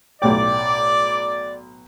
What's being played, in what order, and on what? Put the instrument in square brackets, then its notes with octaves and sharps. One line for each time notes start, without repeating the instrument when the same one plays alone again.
[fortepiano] B1 A2 G5 [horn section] D5